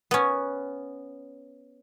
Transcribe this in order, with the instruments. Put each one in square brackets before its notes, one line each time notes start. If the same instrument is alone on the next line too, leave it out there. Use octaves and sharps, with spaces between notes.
[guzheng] B3 C#4